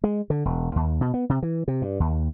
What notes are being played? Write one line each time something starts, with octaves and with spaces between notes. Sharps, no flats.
G#3
D3
E1
D#2
B2
B3
C3
E3
C3
G2
D#2